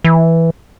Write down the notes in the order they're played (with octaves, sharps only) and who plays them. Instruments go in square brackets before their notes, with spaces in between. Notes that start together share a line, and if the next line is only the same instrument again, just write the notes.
[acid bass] E3